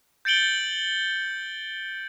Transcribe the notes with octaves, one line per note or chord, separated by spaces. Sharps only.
G6 A6 C#7 D7 F#7 G7